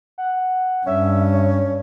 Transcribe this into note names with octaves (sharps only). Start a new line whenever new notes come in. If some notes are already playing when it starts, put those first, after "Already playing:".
F#5
G2 C#4 E5
C#5